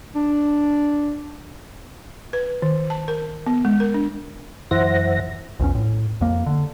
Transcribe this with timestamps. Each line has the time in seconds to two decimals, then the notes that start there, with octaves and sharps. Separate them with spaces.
0.15 D4
2.33 B4
2.62 D#3
2.90 A5
3.08 A#4
3.47 B3
3.65 G#3
3.80 A#4
3.94 D4
4.71 F#2 E3 C5 E5 F#5 A#6
5.60 A#1 E2 C#4
5.75 A2
6.21 F2 A#3
6.46 D3